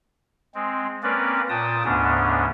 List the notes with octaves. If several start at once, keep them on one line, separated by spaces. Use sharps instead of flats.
G#3 C4
A#3 C4 C#4 A#4 B4 D5
A#2 G5 A5 D#6
D2 G#2 C#3 B3 C#4 D4